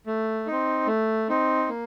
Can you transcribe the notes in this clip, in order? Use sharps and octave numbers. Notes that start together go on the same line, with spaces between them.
A3
C4 D#4
A3
C4 D#4
A#3